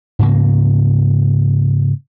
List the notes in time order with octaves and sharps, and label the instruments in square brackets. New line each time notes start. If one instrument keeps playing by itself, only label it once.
[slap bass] G#2 C#3 A#3